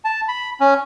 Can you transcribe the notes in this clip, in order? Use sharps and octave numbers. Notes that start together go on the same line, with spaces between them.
A5
B5
C#4